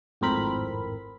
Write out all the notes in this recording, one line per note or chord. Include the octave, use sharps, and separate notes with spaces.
G#1 F2 A2 C4 A#4 B5